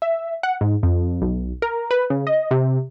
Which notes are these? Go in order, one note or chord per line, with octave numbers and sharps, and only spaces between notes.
E5
F#5
G#2
F2
B1
A#4
B4
C#3
D#5
C3